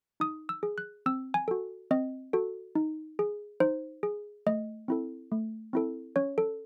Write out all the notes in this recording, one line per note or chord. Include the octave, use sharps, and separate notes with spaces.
D#4 D#6
E6
G#4
F#6
C4 E6
G#5
F#4 A4
C4 D#5
F#4 A4
D#4
G#4
D#4 C5
G#4
A3 D#5
C4 E4 A4
A3
C4 E4 A4
C#4 C#5
A4